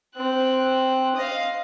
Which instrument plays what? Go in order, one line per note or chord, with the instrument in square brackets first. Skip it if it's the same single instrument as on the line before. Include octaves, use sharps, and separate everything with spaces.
[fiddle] C4 F#6
D#5 F5